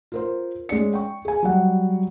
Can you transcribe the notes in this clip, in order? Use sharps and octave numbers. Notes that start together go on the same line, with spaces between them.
F4 A#4 C5
G#3 C#4 D5 C#7
G5 C#6
G#4 G#5
F#3 G3 F#5